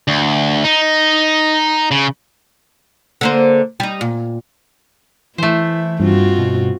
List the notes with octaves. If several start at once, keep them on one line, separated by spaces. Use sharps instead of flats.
D2
D#4
C#3
D3 A#3 C5
G3 D#4
A#2
E3 A3 E4 C5
G2 C4 F4 F#4
B2